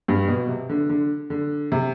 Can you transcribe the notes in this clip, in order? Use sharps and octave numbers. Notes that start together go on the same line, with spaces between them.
G2
B2
C3
D3
D3
D3
C3